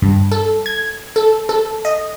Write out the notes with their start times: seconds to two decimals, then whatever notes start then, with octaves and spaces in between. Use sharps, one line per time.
0.02 G2
0.32 A4
0.66 G#6
1.16 A4
1.49 A4
1.85 D#5